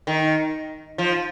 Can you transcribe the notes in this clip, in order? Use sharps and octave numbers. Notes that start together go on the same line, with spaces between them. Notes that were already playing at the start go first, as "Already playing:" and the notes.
D#3
F3